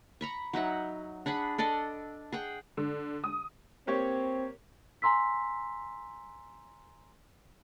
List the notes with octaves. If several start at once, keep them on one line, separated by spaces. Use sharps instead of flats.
A#5 B5 C#6
F#3 D#4 E5 F#5
D4 G#4 F#5 B5
D4 A4 D5 D#5
G#4 F#5 G5
D3
D#6
A#3 C4 G4 C#5
G#5 A#5 C6 E6 B6